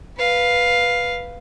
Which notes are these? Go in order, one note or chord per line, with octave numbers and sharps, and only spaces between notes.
B4 F5